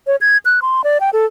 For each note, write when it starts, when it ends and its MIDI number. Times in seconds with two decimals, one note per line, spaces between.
0.07 0.16 73
0.21 0.38 92
0.45 0.60 90
0.62 0.84 84
0.84 1.01 74
1.01 1.10 79
1.13 1.26 69